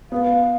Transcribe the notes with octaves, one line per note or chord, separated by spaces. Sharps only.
B3 F5